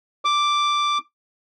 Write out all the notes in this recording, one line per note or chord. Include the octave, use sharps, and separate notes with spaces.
D6